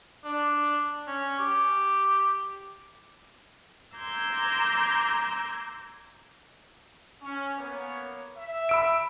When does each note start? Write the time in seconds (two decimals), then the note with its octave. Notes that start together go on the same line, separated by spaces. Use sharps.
0.25 D4
1.08 C#4
1.39 G4
3.96 A#5 C6 D6 E6 G6 G#6
7.22 C#4
7.58 A#3 B3 C#5
8.37 E5
8.69 B5 E6 D7